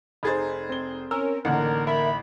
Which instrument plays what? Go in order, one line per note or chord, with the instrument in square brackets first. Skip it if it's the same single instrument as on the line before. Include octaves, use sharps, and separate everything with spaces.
[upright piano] F1 G#4 C5 [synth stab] D#4 [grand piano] B5 G#6 A6
[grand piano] C4 G7
[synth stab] C#4 A#4 [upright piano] E6
[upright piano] A1 [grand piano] D3 A#3 D#4 [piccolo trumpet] A#4 [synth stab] F#5
[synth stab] A#4 E5 [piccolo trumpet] B5